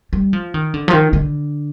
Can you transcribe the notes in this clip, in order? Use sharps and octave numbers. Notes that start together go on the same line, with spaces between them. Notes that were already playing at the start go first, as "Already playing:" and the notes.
G3
F3
D#3
D3
F3
D#3
D3